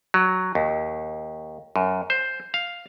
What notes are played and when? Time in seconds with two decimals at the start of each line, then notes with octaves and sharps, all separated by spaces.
0.14 F#3
0.55 D#2
1.76 F#2
2.10 C5
2.54 F5